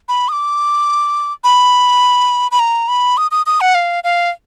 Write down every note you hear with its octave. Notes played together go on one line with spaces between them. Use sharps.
B5
D#6
D6
B5
B5
A#5
B5
D#6
D#6
D#6
F#5
F5
F5